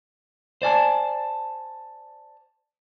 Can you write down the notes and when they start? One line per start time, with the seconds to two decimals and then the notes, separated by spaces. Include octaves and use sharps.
0.62 C5 D5 G#5 A5